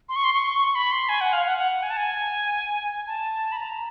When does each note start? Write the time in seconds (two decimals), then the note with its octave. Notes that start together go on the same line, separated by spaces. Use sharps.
0.09 C6
0.16 C#6
0.24 C6
0.34 C#6
0.59 C#6
0.75 B5
0.92 C6
1.09 G#5
1.21 F#5
1.33 F5
1.46 F#5
1.58 F#5
1.83 G#5
1.90 A5
1.97 G#5
3.07 A5
3.52 B5
3.57 A#5